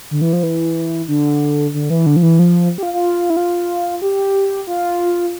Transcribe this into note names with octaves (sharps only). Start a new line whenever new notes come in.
D3
E3
F3
E3
D3
D3
E3
D3
F3
E3
F3
G4
F4
F4
E4
F4
G4
F4